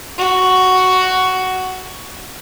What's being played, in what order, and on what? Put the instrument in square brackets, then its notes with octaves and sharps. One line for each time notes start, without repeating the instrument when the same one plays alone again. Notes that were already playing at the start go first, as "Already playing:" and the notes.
[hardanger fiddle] F#4